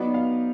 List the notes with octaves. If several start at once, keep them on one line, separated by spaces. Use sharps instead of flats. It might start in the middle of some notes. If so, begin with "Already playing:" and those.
Already playing: F#3 B3 D#4 D5
F5